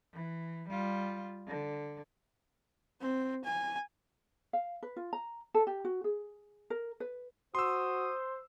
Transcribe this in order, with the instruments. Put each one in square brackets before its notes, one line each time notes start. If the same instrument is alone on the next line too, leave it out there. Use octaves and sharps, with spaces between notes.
[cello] E3
G3 F4
D3
[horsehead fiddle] C4
G#5
[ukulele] F5
B4
F4
A#5
A4
G4
F#4
G#4
A#4
B4
[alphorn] F#4 [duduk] C5 [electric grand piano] C6 E6 [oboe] D#6